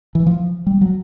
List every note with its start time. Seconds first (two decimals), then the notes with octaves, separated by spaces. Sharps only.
0.15 E3
0.27 F3
0.67 G3
0.81 F#3